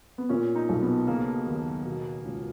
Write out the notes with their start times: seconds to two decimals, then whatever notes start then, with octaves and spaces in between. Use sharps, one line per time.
0.18 B3
0.29 A#2 C#4
0.55 D#4
0.69 B1
0.82 B3
1.07 C#3 A#3
1.46 D#2
1.86 B2
2.25 C#2